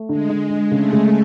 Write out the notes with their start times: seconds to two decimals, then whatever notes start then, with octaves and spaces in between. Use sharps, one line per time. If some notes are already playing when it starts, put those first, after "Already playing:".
Already playing: A3
0.09 D3 G#3
0.30 D3
0.50 D3
0.71 C#3 A3
0.92 C#3